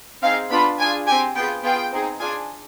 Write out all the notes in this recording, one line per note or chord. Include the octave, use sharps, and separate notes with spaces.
C4 D#4 G#4 F5
B3 D4 F4 B5
D4 F4 G#4 G#5
C4 G4 G#5
B3 F4 G#4 G5
B3 F4 G#4 G5
C4 D#4 G#4
D4 F4 G#4 G#5